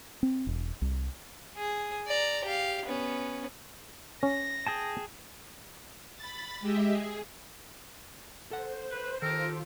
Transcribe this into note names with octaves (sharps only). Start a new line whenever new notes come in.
C4
E1
C2
G#4
D5 A#5
G4 F5
B3 C#4
C#4 A#6
G#4 G5 A5
B5 A6
G#3 G4 D#5 E5
G#4
A4 C5 F#5
B4
D#3 F4 G4 A4 A#4